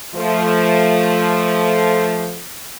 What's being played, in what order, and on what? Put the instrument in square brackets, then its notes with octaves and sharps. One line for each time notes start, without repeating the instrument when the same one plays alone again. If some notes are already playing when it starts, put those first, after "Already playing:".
[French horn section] F3 A3